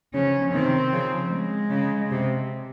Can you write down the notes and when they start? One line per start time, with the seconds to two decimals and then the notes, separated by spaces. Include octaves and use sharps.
0.14 C#3 F3 C#4
0.53 C3 D#3 C4
0.92 C#3 F3
1.31 G#3
1.70 C#3
2.10 C3